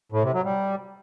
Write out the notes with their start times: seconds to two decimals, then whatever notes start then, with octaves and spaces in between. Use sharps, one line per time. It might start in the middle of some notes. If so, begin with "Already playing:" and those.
0.12 A2
0.23 C3
0.34 F#3
0.45 G3